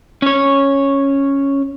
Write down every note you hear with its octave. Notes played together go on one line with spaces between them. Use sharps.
C#4 C#5